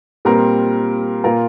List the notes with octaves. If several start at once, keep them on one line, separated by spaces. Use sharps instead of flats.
A#2 G3 C4 A#4
A#2 A#3 F4 A#4